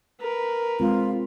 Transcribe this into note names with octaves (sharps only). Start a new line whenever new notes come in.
A#4 B4
G#3 C4 F4